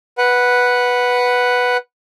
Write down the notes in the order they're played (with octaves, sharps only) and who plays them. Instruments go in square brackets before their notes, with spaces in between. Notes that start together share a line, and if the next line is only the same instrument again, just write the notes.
[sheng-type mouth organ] B4 F#5